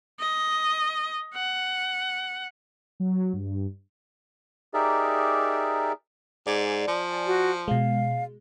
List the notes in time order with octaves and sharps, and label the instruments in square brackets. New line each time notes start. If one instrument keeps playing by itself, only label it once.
[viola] D#5
F#5
[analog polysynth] F#3
G2
[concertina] D#4 G4 G#4 A#4 D5 E5
[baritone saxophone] G#2 [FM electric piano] D5 G#5
[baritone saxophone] F3
[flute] F#4
[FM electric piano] B2 G#3 [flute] F5